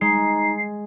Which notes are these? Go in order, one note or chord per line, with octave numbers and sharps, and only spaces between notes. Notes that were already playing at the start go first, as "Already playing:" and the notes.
G#3 D#4 C7